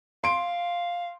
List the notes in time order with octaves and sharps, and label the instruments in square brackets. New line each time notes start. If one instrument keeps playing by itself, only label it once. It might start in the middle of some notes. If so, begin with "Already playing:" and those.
[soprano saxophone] F5 [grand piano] C6 D7